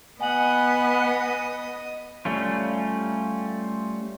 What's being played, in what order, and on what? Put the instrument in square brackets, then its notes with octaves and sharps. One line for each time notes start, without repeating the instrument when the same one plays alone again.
[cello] B3 [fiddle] D#5 D#6 [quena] F#5 [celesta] G#5 F#7
[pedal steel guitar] G3 A3 C#4 F4